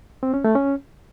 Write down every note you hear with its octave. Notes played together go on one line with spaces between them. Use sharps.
C4
C#4
A3
C#4